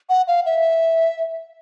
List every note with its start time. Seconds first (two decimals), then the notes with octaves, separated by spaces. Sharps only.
0.09 F#5
0.28 F5
0.46 E5